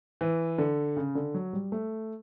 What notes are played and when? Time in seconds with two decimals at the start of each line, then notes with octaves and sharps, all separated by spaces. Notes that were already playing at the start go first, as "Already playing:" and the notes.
0.21 E3
0.58 D3
0.96 C#3
1.15 D3
1.34 F#3
1.53 G3
1.72 A3